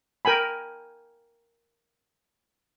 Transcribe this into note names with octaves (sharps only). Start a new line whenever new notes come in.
A#4 G5 G#5 B5